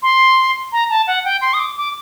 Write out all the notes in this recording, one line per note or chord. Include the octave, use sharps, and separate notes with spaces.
C6
A#5
A5
F#5
G5
C6
D#6
D6
D6